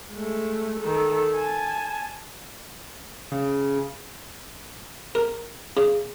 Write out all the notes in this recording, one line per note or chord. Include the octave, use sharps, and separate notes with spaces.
G#3 A3
D#3 A4
G#5 A5
C#3
A#4
C#3